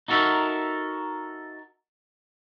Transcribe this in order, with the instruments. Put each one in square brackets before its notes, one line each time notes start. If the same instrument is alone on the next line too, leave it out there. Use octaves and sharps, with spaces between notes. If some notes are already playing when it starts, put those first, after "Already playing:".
[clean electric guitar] D#4 F#4 A4 A#4 E5